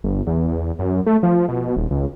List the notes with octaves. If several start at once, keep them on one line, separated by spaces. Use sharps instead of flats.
G1
E2
E2
F#2
A3
F3
B2
D#1
C#2